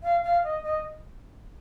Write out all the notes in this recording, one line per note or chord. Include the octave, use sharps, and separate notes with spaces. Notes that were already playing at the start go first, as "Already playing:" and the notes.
F5
F5
D#5
D#5